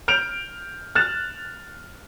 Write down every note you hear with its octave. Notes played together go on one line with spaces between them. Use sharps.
F6 G6 D7 F7
F6 F#6 A6 E7